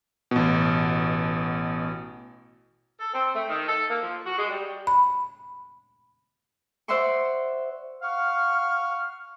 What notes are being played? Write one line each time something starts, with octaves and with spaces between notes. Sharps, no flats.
A1 B2
A4
C4
A3
D#3
A4
A#3
F3
F#4
G#3
G3
B5
C5 D5 E5 F#5 C6 C#6
F5 F#5 C#6 F6